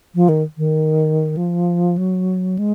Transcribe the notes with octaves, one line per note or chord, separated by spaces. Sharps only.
F3
D#3
D#3
F3
F#3
G#3